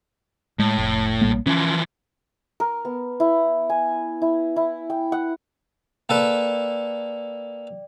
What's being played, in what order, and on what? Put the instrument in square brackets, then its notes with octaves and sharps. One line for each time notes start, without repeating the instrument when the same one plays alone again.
[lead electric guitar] A2 [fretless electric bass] G#3
[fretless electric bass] F1
A#1 G3 A#3
[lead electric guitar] E3 F3 [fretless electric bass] C#4
[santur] A#4
B3
E4
G#5
E4
E4
G5
F#5
[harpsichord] A#3 A4 B4 [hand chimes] D5 G5